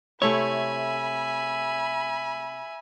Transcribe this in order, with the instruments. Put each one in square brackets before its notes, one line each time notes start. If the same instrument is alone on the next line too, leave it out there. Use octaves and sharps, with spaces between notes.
[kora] C3 A3 E4 [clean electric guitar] C#5 [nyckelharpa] E5 G#5 [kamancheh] B5